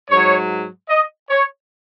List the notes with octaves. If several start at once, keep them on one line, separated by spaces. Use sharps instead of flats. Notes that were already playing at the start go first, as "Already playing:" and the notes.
G#2 F#3 C#5
D#5
C#5